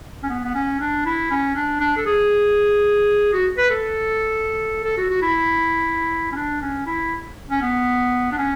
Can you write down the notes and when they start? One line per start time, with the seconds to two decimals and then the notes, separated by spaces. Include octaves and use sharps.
0.23 C#4
0.30 B3
0.44 B3
0.54 C#4
0.80 D4
1.06 E4
1.31 C#4
1.56 D4
1.81 D4
1.97 A4
2.06 G#4
3.33 F#4
3.58 B4
3.70 A4
4.84 A4
4.97 F#4
5.10 F#4
5.22 E4
6.32 C#4
6.36 D4
6.61 C#4
6.86 E4
7.51 C#4
7.62 B3
8.32 D4
8.38 C#4